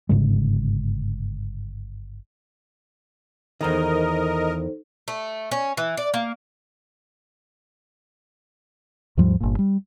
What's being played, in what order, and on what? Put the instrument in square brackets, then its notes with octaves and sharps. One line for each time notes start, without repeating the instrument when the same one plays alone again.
[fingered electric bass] G1 G#2 C#3 G#3
[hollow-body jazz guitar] E2 D#3 [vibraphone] D#4 A4 C5 [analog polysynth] A#4 D#5
[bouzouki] A3
C#4
E3
D5
A#3
[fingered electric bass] D#2 G#2 F3 G3
G1 A#2
G3